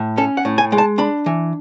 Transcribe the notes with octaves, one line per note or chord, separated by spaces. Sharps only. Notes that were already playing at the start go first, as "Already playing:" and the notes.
Already playing: A2
C#4 A4
F#5
A2
G#5
G#3
A5
D4 B5
E3